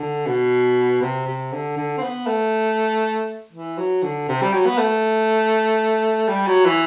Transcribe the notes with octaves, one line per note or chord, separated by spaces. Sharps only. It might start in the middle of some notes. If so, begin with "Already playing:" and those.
Already playing: D3
B2
C3
C3
D3
D3
C4
B3
A3
E3
F#3
D3
C3
G3
F#3
B3
A3
G3
F#3
E3